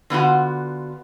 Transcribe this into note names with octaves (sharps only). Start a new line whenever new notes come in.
D3 B3 F4 F#4